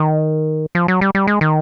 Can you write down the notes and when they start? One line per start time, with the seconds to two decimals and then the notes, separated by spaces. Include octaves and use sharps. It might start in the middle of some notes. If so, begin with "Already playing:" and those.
Already playing: D#3
0.75 F3
0.88 F#3
1.01 G3
1.15 G3
1.27 G#3
1.41 D#3